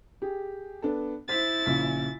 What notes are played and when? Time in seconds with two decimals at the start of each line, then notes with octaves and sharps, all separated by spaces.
0.22 G4 G#4
0.82 B3 D4 A4
1.29 E4 C5 A6 B6
1.66 A#1 C#3 B6